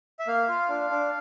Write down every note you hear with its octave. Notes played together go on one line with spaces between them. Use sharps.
E5
A#3 F5
F4
D4
D4